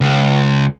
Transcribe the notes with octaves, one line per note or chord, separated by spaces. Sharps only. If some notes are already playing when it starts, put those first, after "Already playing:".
C#2